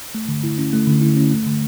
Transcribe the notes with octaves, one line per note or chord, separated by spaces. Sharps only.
A3
D3
E4
C#4
A3
D3
E4
C#4
A3
D3